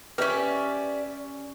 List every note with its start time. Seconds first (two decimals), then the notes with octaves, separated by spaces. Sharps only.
0.18 A#3 C#4 G4 B4 D5 E5